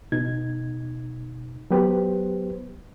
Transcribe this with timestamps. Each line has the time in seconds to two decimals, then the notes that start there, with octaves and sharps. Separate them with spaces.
0.12 B2 D#4 G#6
1.71 F#3 B3 G4 B4 C5